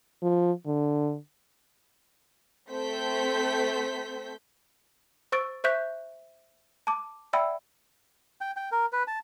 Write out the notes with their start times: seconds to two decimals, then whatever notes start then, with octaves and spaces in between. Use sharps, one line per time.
0.22 F3
0.67 D3
2.71 A3 C4 A4 C5 G6 B6
5.32 C5 C#6 E6 A6 D7
5.64 C5 E5 C#6 F#6 G6 B6
6.87 A5 D6
7.33 D5 E5 F#5 G5 B5 E6
8.41 G5
8.57 G5
8.72 A#4
8.93 B4
9.07 A5